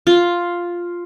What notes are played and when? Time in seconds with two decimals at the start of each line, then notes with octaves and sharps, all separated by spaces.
0.07 F4